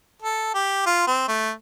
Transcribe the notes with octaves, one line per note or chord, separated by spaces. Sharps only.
A4
G4
F4
C4
A3